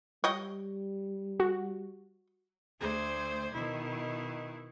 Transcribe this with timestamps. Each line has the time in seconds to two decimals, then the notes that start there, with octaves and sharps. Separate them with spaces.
0.24 G3 C#5 D#5 G5
1.40 F#4
2.79 D2 A3 C5 D5 G#6
3.53 B2 D#3 E4